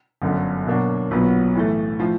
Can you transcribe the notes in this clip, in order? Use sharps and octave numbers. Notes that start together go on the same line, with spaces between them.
G1 F#2 D3
B2 F#3 A#3 D4 F#4
B1 A#2 F#3 B3
A2 E3 A3
A2 F3